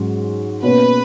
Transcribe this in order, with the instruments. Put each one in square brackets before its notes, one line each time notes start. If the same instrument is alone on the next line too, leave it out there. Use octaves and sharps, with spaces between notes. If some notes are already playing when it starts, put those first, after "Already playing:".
Already playing: [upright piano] G#2 F#3 C#4 F#4
[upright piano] B2 A#3 C#4 [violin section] B4